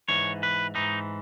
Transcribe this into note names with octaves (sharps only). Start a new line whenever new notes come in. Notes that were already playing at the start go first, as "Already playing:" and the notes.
G#2 E3 C#5
B4
G#2 E3 D#4